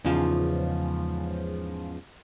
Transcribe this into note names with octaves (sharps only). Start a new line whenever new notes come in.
E2 G#2 C#3 F3